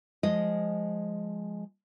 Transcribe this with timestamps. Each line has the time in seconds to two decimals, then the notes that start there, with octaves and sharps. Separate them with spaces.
0.23 F3 G#3 D#5